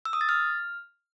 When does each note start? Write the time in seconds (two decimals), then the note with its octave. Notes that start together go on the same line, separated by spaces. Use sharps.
0.05 E6
0.13 D#6
0.21 A6
0.29 F6